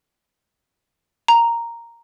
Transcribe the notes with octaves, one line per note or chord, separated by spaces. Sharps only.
A#5